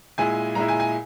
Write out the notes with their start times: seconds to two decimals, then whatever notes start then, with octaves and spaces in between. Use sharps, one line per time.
0.18 A#2 G#3 E4 G#5
0.55 A#2 G#3 E4 A#5
0.68 G#5
0.80 G#5